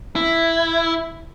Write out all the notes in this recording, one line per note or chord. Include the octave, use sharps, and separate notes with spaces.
E4